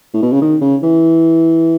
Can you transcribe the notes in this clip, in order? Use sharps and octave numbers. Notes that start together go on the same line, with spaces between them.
A2
B2
C#3
D#3
C#3
E3